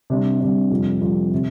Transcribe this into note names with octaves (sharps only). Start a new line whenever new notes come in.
C3 G3 D4
C3 G3 D4
F2 C3 G3
F2 C3 G3
C3